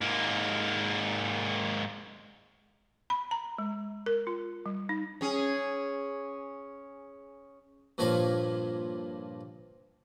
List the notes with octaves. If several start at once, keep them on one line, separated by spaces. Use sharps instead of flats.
G#2 A#3
B5
A#5
G#3
A#4
F4
G3
D#4
C#4 G#4
G2 A#2 F3 C#5 F5